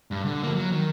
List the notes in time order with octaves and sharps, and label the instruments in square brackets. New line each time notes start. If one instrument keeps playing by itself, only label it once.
[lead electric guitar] G2
D3
F3 A#3
F#3
D#3